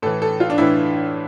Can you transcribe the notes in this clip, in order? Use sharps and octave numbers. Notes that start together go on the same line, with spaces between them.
A2 E3 A4
A4
F4
D4
A2 E3 E4